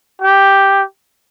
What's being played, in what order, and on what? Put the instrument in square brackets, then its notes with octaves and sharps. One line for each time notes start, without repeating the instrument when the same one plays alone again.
[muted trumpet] G4